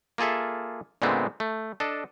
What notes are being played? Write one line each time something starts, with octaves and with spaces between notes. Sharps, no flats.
A#3 F4 G#4 A4 E5
A#2 D3 G#3 A3 B3 C4
A3
D4 A4 D#5